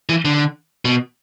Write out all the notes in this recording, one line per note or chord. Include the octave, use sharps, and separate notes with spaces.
E3
D3
B2